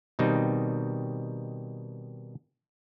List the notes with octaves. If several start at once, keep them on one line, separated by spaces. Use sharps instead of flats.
B2 D#3 G3 C4 D#4